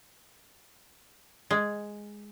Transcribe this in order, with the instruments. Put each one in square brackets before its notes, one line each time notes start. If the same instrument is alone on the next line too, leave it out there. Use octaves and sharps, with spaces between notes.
[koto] G#3